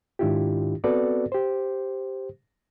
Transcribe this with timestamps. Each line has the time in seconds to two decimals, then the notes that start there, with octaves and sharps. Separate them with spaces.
0.19 G#2 D#3 D4 E4 F4 G4
0.84 B3 C4 F#4 A4 B4 D5
1.32 G4 C5